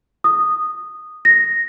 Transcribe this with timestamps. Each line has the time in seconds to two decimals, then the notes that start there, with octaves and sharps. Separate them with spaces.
0.24 D#6
1.25 A#6